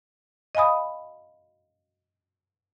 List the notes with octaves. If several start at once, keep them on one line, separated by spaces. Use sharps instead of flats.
D#5 F5 G#5 B5 D#6